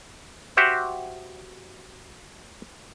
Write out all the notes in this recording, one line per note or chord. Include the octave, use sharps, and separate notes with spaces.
F#4 G4 C5 E5 F#5